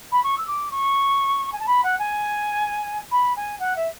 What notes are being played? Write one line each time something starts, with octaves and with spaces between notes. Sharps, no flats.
B5
C#6
E6
D6
C#6
G#5
A5
B5
F#5
G#5
B5
G#5
F#5
E5